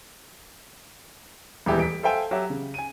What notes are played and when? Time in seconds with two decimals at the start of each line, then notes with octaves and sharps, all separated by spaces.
1.66 D#1 E2 E3 G#3 G4 E5
1.79 B6 D7
2.03 A4 C5 E5 F5 G5 G#5
2.31 F#3 G4 C#5 E5
2.50 C#3
2.74 G#5 D#7